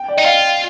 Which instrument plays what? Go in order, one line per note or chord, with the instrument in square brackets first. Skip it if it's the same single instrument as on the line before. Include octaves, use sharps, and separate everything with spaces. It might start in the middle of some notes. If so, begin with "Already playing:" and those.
Already playing: [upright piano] G5
D5
[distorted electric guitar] D#4 [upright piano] D#5
[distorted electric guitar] F4 [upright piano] F5